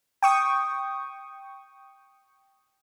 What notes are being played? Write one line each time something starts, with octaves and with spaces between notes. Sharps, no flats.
G5 C#6 D#6